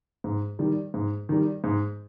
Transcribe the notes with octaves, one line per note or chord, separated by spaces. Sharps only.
G#2
D#3 G3
G#2
D#3 G3
G#2